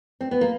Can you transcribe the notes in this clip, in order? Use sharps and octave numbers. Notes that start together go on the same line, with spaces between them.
C4
B3
A#3